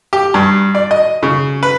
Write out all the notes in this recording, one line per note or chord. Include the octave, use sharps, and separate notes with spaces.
G4
G2
D5
D#5
C#3
B4